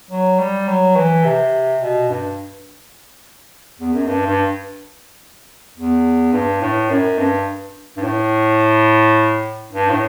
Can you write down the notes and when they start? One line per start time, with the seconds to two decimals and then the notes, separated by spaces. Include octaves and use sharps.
0.11 F#3
0.39 G3
0.68 F#3
0.96 E3
1.24 C3
1.81 B2
2.09 G2
3.79 E2
3.94 F#2
4.07 G2
4.26 G2
5.77 E2
6.33 G2
6.62 A2
6.90 F#2
7.18 G2
7.97 G2
8.03 A2
9.73 G2
9.90 A2